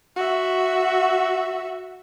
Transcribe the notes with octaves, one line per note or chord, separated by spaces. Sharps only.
F#4 E5